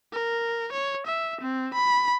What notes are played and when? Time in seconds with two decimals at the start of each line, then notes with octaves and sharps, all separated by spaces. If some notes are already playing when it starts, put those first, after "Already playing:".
0.13 A#4
0.73 C#5
1.07 E5
1.41 C4
1.74 B5